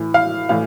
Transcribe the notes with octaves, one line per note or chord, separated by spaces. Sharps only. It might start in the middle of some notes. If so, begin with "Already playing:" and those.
Already playing: A2 E3
F5
A2 E3 F5